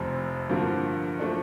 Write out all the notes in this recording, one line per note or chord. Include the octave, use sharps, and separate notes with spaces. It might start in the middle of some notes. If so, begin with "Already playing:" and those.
Already playing: F1 F2 C3
G2 D3 F3 A#3
F3 A3 D4